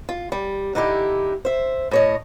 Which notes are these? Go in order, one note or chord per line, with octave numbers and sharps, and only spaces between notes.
F4
G3
D3 D#4 E4 G4
C5 E5
A2 C#5 D#5